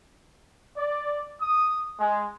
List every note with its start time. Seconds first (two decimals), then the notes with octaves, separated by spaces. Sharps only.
0.76 D5
1.40 D#6
1.99 G#3